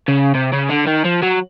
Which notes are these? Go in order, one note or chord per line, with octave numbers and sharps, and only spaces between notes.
C#3
C3
C#3
D3
D#3
F3
F#3